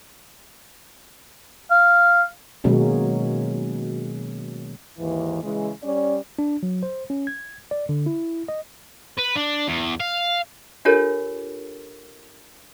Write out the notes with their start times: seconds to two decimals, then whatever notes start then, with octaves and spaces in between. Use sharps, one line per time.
1.71 F5
2.64 B2 D#3 F#3 G#3 A#3 C#4
4.99 D#2 G#2 E3
5.43 C#3 E3 G#3
5.83 G3 C#4 D5
6.39 D4
6.63 F#3
6.83 C5
7.10 C#4
7.27 G#6
7.71 D5
7.89 D3
8.06 E4
8.48 D#5
9.19 B4
9.36 D4
9.67 E2
10.00 F5
10.85 D4 F4 G4 A4 A#4 C#5